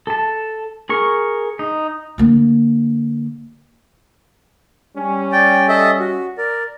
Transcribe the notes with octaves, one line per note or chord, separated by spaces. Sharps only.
A4 A5
G#4 A#4 C#6
D#4
D3 A#3
G3 C#4
D5 G5
A4 D#5 E5
F#4
A#4 D5